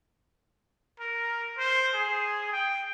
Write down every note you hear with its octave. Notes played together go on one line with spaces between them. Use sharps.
A#4
C5
G#4
G5